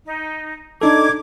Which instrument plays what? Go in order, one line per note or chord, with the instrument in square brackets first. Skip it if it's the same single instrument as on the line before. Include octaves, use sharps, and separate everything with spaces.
[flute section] D#4
[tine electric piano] D4 D#4 A4 [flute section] D6 G#6